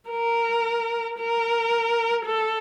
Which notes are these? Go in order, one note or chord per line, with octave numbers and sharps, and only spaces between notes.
A#4
A#4
A4